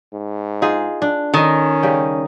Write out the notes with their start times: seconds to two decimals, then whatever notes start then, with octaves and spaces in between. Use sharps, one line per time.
0.13 G#2
0.62 D#4 F4 G#4
1.02 D4
1.34 D#3 C#4 A4 D#5
1.83 C#3 G3 G5